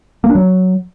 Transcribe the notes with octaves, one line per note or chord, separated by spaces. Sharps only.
A#3
D4
F#3